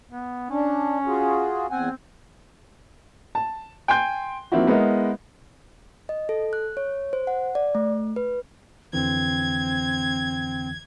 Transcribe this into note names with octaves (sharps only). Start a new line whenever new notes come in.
B3
C#4 D4
F4 F#4 G#4
E2 C4 F#5 G#5
A5
G5 G#5 C6 G6
F3 A#3 C4 D#4 E4 F#4
G#3 B3 E4 A#4 D#5
D#5
A4
F#6
C#5
C5
F#5
D5
A3
B4
F2 D3 E3 C4 G#6